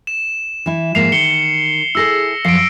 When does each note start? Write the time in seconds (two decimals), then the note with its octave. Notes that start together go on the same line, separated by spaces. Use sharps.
0.07 E7
0.66 E3 E4
0.95 G#2 F3 A#3 C7 F7
1.12 D#3 C#7 G7
1.95 E4 G#4 A4 E6 A#6 C7
2.45 F#2 F3 F5 C7 D7